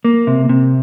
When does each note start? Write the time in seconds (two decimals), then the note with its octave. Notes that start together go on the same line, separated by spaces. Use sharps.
0.05 A#3
0.27 C3
0.49 C3